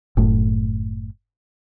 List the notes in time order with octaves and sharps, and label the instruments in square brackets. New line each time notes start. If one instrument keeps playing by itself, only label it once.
[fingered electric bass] F#1 A2